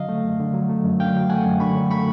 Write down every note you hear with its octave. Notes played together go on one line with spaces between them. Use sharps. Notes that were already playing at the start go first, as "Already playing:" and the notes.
Already playing: D3 F#3 D#5 F5
A3
F#2
D3
F#3
A3
F#2
D3 F5 G5
F#3
A3 F#5 G#5
F#2
D3 B5 C#6
F#3
A3 B5 C#6